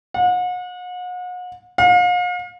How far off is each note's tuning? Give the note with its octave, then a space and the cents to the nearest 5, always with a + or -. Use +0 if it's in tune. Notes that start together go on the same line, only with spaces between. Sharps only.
F#5 -40
F5 +40